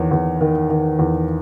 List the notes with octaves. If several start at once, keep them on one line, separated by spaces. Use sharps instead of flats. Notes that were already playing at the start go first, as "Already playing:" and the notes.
Already playing: E2 D#3 C#5
E2
D#3
D#3
E2